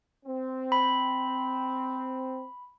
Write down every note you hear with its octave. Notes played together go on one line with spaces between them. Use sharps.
C4
B5